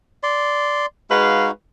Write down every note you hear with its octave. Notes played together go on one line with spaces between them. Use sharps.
D5 C6
G#3 D#4 F#4 B4 F5